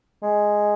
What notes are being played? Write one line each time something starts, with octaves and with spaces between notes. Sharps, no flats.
G#3